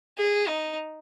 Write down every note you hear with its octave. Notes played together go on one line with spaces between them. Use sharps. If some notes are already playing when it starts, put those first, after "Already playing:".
G#4
D#4